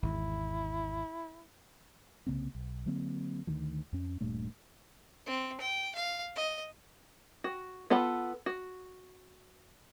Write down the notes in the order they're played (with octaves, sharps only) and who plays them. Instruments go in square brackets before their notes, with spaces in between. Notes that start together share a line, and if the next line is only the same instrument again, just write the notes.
[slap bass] G#1 E2 [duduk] E4
[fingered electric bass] C2 C#3 A#3 C4
B1
D3 F#3 A#3 C4
D2 D3 D#3 F3
F2 C#4
D#1 G2 A#2 A3
[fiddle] C4
G5
F5
D#5
[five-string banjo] F#4
B3 F4 A4 F#5 B5
F#4